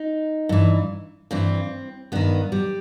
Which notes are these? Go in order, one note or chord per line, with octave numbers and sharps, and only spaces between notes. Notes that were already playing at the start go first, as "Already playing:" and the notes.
Already playing: D#4
G2 E3
G2 E3 C4
G2 D#3 B3
G3